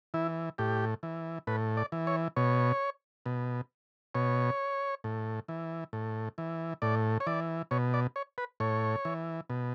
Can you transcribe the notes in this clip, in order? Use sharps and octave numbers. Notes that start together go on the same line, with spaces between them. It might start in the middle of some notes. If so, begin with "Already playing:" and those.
E3 E4
A2 G4
E3
A2 B4
D5
E3
C#5
B2 C#5
B2
B2 C#5
A2
E3
A2
E3
A2 D5
C#5
E3 D5
B2 C#5
D5
C#5
B4
A2 C#5
E3
B2